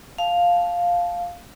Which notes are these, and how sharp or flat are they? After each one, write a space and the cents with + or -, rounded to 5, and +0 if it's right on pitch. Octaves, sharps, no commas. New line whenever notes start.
F5 +5 A5 -15